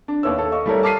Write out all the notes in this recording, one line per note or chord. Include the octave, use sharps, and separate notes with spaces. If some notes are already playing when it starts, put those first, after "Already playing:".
D4
D#2 B3 E4 C#5 E6
A4
D#5 F5 C#6
G3 A3 E4 A4 A#4 C#5
A5 D6 F6 B6 C7 D#7